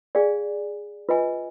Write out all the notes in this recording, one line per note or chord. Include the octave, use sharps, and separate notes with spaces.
G#4 D5 F5 G#5
F4 B4 D#5 G#5